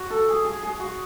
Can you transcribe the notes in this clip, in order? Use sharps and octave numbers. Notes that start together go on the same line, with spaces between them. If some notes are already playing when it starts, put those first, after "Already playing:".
Already playing: F#4
A4
G#4
G#4
G#4
F#4